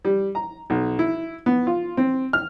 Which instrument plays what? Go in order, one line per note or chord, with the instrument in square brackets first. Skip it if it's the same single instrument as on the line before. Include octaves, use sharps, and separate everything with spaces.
[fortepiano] G3
A#5
B1
E4
B3
F4
C4
F6